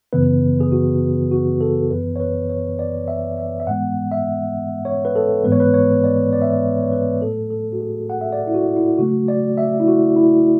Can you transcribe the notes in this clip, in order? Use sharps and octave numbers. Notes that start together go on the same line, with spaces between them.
F#2 C#3 E3 B3 B4
G#4
F#4
F#4
A4
F#2 E3 B3 B4
C#5
B4
C#5
D5
E5
E5
E5
G#2 E3 G#3 B3 F#5
E5
C#5
B4
A4
G#2 E3 G#3 B3 B4
C#5
B4
C#5
D5
D5
E5
D5
C#5
B4
A2 F#3 A3 A4
A4
F#4
G#4
F#5
E5
D5
E4
F#4
E4
C#3 F#3 A3 F#4
D5
E5
E4
F#4
E4